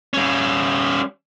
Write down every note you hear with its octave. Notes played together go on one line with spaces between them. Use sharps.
G3 C#4